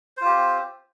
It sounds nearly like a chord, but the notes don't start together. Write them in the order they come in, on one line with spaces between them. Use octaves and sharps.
C5 F4 G4 C4